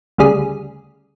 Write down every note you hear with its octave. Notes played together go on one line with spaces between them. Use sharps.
D2 C#3 G3 G#4